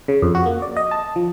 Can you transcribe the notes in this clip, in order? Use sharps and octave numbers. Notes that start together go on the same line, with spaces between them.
C#3
F2
F#4
A#3
D5
D#5
A5
F3